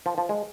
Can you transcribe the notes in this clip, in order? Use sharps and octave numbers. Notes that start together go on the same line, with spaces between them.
F3
F3
G#3